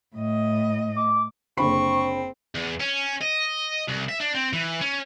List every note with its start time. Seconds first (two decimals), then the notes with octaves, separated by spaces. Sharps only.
0.16 A2 D#5
0.96 D6
1.57 F#1 D3 C4 B5 C#6
2.55 E2
2.80 C#4
3.22 D#5
3.88 C2
4.08 E5
4.20 D4
4.35 C4
4.53 E3
4.81 C#4